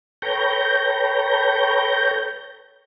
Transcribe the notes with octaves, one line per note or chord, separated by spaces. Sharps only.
A4 B4 C#5 G5 A#5 G6